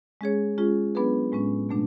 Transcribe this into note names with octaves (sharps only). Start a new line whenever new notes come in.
G#3 C#4 G#4 C#5
G#3 C#4 F4 G#4
F#3 B3 D4 G#4 B4
A2 G#3 C#4
B2 F#3 A3 D4